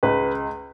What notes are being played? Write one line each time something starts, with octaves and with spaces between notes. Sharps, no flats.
C#2 B4